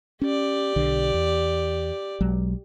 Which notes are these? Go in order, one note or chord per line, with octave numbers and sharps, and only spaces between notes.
C#4 G4 D5
B1 D3
E2
B1 F#3 G#3